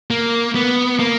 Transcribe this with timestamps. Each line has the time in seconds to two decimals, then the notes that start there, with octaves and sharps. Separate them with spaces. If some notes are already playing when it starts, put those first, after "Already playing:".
0.10 A#3
0.55 B3
0.99 A#3